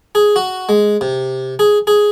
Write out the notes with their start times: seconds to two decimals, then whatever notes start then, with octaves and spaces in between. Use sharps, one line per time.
0.15 G#4
0.36 F#4
0.69 G#3
1.01 C3
1.59 G#4
1.87 G#4